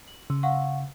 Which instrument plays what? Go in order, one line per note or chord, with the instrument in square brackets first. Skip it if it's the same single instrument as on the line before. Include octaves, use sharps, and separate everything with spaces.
[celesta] F#7
[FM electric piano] C#3
[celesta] F5 F#5 C#6